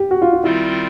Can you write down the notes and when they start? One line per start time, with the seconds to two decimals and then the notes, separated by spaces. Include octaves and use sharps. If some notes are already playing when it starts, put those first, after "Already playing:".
Already playing: G4
0.11 F#4
0.22 F4
0.33 F4
0.43 D#3 G3 C4 E4 F4 A#4